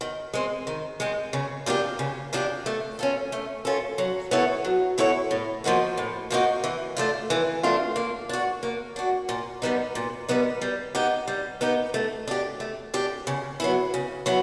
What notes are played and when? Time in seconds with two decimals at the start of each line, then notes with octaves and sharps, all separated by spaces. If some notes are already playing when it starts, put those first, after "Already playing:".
0.01 D#3
0.34 G#3 C4
0.67 D#3
1.00 G#3 C4
1.33 C#3
1.66 F3 A#3 D4 G4
1.99 C#3
2.33 F3 A#3 D4 G4
2.66 A3
2.99 C#4 F4 A4
3.32 A3
3.65 C#4 F4 A4
3.98 F#3
4.31 B3 E4 A4 C#5
4.65 F#3
4.98 B3 E4 A4 C#5
5.31 A2
5.64 F3 A#3 D#4 F#4
5.97 A2
6.31 F3 A#3 D#4 F#4
6.64 E3
6.97 A3 D4 F4
7.30 E3
7.63 A3 D4 F4
7.96 A#3
8.29 D4 F#4
8.63 A#3
8.96 D4 F#4
9.29 A#2
9.62 G3 B3 D#4
9.95 A#2
10.29 G3 B3 D#4
10.61 G3
10.95 B3 D#4 G4
11.28 G3
11.61 B3 D#4 G4
11.94 A3
12.28 D4 G4
12.60 A3
12.94 D4 G4
13.27 C#3
13.60 F#3 B3 E4
13.94 C#3
14.26 F#3 B3 E4